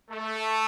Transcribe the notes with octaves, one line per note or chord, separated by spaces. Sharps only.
A3 A4